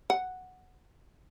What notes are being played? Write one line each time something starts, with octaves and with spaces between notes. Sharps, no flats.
F#5